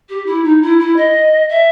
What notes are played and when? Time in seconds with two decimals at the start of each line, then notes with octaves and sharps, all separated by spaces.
0.09 G4
0.26 E4
0.44 D#4
0.62 E4
0.79 E4
0.96 D#5
1.49 E5